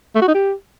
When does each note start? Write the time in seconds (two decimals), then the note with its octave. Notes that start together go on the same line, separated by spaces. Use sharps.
0.15 A3
0.21 F#4
0.28 D#4
0.34 G4